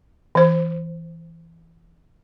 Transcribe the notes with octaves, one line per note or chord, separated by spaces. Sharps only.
E3 C5